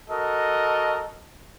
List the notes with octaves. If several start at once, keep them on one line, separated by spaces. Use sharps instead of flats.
F#4 A4 A#4 D#5